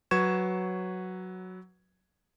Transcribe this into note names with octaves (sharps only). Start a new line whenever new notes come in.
F#3 B4 C#6 G#6 E7